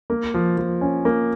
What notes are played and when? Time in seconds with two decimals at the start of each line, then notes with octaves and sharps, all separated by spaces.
0.10 A#3
0.34 F3
0.58 F3
0.81 C#4
1.05 A#3